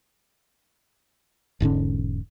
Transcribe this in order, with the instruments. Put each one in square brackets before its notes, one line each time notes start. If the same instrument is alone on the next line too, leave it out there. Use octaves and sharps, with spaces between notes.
[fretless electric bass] E1 G#2 D3 C#4